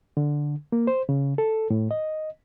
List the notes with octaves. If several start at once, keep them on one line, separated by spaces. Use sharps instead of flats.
D3
A#3
C5
C#3
A4
A2
D#5